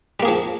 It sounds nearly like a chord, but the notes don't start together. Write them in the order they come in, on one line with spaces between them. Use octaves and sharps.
G3 A#3 G#4 F3